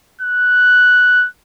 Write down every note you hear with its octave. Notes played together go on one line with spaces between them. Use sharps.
F#6